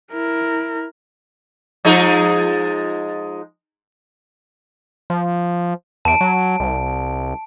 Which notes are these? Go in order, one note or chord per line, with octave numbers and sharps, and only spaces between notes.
E4 A#4
F3 G#3 D#4
F3
E2 A5 D7
F#3
C2